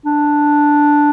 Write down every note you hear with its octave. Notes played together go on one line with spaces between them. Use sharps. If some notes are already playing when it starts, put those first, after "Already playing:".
D4